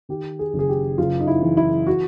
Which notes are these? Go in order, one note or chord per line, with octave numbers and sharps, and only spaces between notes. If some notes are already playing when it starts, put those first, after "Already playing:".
D#3 G4
G#4
F#1
G#4
G4
F#1 F4
D#4
E4
E3
E4
F#4